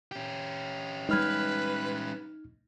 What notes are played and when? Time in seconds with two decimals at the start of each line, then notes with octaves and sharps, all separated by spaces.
0.12 C#4 G4
1.09 G3 G#3 D#4 B4 F6 G#6